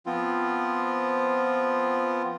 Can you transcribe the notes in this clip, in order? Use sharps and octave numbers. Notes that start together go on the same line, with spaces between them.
F3 B3 C4 F4